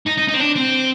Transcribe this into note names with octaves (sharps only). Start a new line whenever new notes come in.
D#4
D#4
D#4
C4
D4
C4